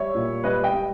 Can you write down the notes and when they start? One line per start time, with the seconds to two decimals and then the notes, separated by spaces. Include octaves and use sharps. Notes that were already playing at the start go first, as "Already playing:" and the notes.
Already playing: G3 C#5 E5
0.15 A#2
0.44 G3 B4 D#5
0.64 D#5 G5
0.73 G3